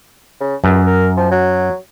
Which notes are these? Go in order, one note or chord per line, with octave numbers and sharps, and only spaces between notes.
C#3
C#2 F#2
A#4
F3
F#3